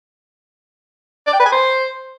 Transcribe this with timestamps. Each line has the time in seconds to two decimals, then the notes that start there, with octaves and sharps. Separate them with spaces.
1.27 D5
1.33 G5
1.39 B4
1.46 G#5
1.52 C5